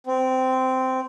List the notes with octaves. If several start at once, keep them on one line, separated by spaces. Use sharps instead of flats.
C4